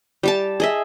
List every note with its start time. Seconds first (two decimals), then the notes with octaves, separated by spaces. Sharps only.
0.23 G3 G4 A5
0.60 G#4 D#5 E5